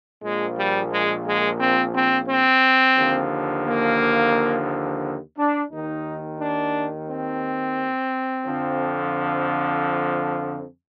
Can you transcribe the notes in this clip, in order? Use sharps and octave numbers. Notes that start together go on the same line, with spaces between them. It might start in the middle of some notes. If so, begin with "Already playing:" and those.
A#1 A#2 F3 G#3
G3
G#3
G#3
C4
C4
C4
D#2 D3 F3
A#3
D4
D#2 D#3 D#4
D4
C4
F2 D3 F3